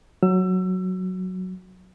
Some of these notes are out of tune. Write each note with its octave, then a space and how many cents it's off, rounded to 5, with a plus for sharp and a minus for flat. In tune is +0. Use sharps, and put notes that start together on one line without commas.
F#3 +0 E6 +25